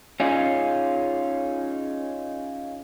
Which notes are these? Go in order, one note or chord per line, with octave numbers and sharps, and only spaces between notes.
C#4 D#4 F4 G#4